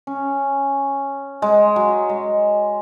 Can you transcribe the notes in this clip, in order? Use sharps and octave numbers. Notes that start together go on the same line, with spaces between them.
C#4
G#3
F#3
G#3